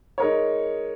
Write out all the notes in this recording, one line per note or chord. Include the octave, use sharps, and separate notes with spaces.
G#3 D#4 A#4 C#5